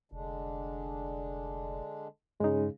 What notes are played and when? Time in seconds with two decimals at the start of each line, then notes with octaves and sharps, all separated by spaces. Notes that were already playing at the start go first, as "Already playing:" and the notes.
0.12 F1 D3 G#3 D4
2.40 G2 C#3 G#3 D#4